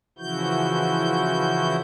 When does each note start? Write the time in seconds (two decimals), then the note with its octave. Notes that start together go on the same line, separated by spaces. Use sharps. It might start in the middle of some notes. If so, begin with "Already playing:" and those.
0.19 C#3 E3 F3 E4 F#4 G6